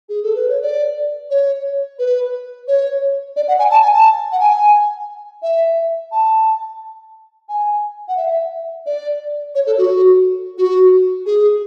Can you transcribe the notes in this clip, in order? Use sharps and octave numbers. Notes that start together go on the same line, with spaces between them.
G#4
A4
B4
C#5
D5
C#5
B4
C#5
D5
F#5
G#5
A5
G#5
A5
F#5
G#5
E5
A5
G#5
F#5
E5
D5
C#5
A4
F#4
F#4
G#4